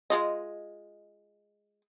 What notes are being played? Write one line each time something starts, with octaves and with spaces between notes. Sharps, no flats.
G#3 F4 D#5